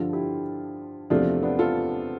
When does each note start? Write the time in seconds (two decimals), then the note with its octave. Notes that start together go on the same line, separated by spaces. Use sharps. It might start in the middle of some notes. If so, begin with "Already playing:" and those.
Already playing: G2 D3 F3 F4 A4
0.13 E4 G4
1.10 E2 C3 F3 A3 D4 F4
1.43 B3 D4
1.59 F4 A4